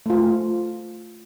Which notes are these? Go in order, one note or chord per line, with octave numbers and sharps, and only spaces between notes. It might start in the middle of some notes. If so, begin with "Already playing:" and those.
A3 F4